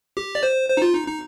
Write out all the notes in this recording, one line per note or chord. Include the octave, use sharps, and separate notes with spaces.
G4
D5
C5
C5
D#4
F4
D#4
D#4